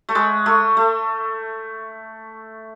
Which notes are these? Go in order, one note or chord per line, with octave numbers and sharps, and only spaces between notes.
A3
G#3
A3
A3